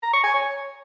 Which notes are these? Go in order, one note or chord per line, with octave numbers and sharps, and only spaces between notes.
A#5
C#6
G#5
C#5